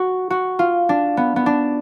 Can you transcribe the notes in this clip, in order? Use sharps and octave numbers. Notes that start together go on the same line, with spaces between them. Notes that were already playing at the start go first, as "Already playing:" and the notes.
Already playing: F#4
F#4
F4
D4
B3
B3
D4